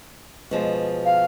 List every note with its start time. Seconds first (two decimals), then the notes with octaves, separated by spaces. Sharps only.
0.51 B2 F3 G#3
1.05 F5